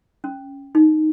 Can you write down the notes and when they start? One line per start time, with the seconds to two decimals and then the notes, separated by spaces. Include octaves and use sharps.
0.24 C#4
0.75 D#4